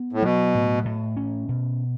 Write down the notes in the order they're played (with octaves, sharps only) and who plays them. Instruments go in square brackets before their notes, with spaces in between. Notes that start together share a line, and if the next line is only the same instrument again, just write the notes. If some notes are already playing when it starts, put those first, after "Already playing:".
Already playing: [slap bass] B3
[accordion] A2
[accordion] B2 [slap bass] F#3
[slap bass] A2
A2
C#4
B2